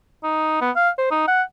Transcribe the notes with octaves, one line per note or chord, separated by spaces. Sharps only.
D#4
B3
F5
C5
D#4
F#5